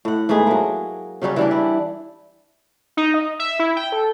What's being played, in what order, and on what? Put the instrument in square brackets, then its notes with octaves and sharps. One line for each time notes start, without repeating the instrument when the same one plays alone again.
[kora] A2 F#5
G#2 A3 B3 G#4
F#3 A#3
C#3 F#3 G3 C#4
E3 G3 D4
E4
[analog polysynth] D#4
D#5
E5
E4
G5
A4